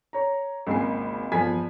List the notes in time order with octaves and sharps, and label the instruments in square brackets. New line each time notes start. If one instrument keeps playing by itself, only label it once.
[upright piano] C#5 A#5
G#1 C#2 G#3 A#3 G#5 C7
G1 E2 F3 G#5 G#6 B6